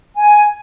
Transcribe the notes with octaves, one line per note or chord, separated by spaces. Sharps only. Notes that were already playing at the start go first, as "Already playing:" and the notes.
G#5